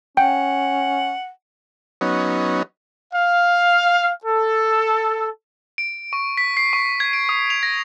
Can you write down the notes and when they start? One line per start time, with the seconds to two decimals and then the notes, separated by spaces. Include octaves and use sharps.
0.17 C#4 F#5 G5
2.01 F#3 B3 C#4 D#4
3.13 F5
4.24 A4
5.78 D7
6.13 C#6
6.37 B6
6.57 C7
6.73 C#6
7.00 G#6
7.13 D7
7.29 D#6
7.50 F7
7.63 A#6